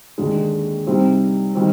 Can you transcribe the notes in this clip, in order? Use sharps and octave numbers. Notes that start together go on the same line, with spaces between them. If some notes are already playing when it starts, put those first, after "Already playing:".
D#2 D3 G#3
C3 G3 C4 D#4
D#3 G3 C4